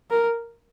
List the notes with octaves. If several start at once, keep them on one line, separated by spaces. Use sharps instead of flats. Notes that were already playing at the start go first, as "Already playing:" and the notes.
A#4